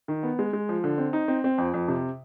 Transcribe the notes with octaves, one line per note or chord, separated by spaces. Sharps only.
D#3
B3
G#3
G#3
F3
D3
C4
D#4
C4
C4
F2
F2
C3